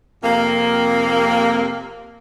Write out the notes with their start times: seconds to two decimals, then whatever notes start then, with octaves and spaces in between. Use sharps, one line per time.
0.24 F2 C3 A#3